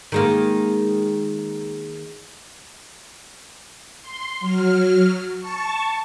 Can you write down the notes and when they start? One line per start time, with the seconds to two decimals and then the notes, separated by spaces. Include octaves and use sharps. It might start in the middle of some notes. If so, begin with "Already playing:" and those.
0.12 D#3 G#3 A#3
4.02 C6
4.40 F#3 F6
5.37 A5 C#6